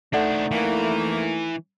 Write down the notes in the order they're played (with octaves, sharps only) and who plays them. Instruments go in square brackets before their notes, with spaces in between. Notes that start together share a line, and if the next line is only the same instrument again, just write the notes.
[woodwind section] A3 D#4 [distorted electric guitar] D4 C5 [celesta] A4 D5 F#5
[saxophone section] F2 A#3 [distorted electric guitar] E3